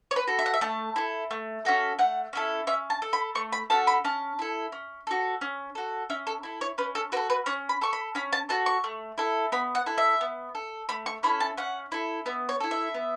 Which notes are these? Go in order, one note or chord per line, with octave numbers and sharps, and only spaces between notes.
C#5
B4
F#4 A4
E5
F#5
E5
A3 A5
E4 A4
A3
C#4 F#4 A4
A3 F#5
C#4 E4 A4
C#4 E5
A5
A4
B5
A3 C#6
B5
C#4 F#4 A4 A5
B5
C#4 A5
E4 A4
C#4
F#4 A4
C#4
F#4 A4
C#4 E5
A4
E4 A4
C#5
C#4 B4
A4
F#4 A4 B4
B4
C#4 C#5
B5
A4 C#6
B5
C#4 B5
A5
F#4 A4 A5
C#6
A3
E4 A4
B3 B5
F#5
E4 A4
E5
B3
A4
A3 B5
C#6
C#4 E4 A4 B5
A5
C#4 F#5
E4 A4
B3 E5
C#5
E4 A4
E5
B3